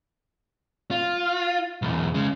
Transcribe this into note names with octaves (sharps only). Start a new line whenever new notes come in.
F4
B1 E2
C#3 G#3